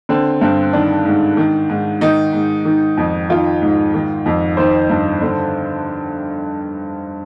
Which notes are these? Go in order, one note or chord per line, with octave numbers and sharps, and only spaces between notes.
D3 C4
G2 C4
D#3 D4
G#2
D#3
G#2
D#3 D#4
G#2
D#3
F2
D#3 F4
G#2
D#3
F2
D#3 C5
G2
D3